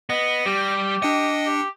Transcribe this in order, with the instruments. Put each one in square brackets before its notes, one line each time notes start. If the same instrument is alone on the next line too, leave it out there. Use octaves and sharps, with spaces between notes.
[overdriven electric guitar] B3 [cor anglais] D#5 [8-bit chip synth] A#6
[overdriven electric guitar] G3 [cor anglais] G4
[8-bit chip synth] D4 G5 C#7 [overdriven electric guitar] D#5
[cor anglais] G4